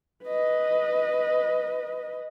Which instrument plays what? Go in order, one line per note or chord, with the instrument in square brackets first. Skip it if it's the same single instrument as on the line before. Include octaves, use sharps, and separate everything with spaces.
[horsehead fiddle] B4 D#5